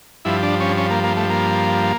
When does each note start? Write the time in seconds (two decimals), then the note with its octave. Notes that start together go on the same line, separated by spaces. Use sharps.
0.25 G2 F3 E4
0.43 D4
0.60 C#4
0.78 C#4
0.91 A#3
1.04 A#3
1.16 A3
1.30 A#3